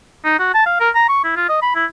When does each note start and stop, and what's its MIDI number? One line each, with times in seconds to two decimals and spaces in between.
0.25 0.38 63
0.39 0.54 66
0.54 0.65 81
0.66 0.76 77
0.80 0.90 70
0.95 1.04 82
1.09 1.21 85
1.24 1.32 64
1.36 1.44 65
1.49 1.58 75
1.62 1.71 83
1.75 1.85 64